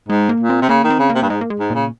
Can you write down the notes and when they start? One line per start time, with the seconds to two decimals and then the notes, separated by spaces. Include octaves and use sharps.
0.09 G#2 G#3
0.29 A#3
0.40 A#2
0.50 C4
0.62 C3
0.69 C#3 A#3
0.84 D#3
0.90 C4
0.99 C#3
1.10 A#3
1.15 C3
1.23 G2
1.29 G#2 G#3
1.41 A#3
1.50 G#3
1.60 G#2
1.70 A#2 C#3